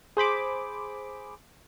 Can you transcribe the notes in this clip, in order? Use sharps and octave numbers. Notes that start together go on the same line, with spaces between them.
G#4 C5 B5 D6